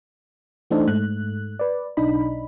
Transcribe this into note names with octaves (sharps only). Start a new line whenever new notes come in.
E3 A3 D4 D#4 A4 C5
G#2 A3 F#6
B4 D5
B1 D4 D#4 B5